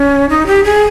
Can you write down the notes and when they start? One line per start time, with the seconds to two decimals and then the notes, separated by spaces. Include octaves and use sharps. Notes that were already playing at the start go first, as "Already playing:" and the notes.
Already playing: C#4
0.29 D#4
0.47 G4
0.64 G#4